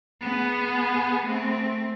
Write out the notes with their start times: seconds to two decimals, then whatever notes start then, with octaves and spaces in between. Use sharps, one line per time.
0.22 B3 G#4
1.26 A3 C4